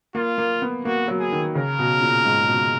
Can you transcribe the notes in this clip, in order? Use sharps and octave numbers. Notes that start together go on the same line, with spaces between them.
A#3 F4
A#3
B3
A#3 F#4
F#3
G#4
D#3
C#3 A#4
B2
A#2
G#2
B2